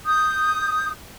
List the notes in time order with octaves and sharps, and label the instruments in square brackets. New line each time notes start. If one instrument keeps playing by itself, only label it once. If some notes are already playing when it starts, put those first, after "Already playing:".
[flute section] D#6 G6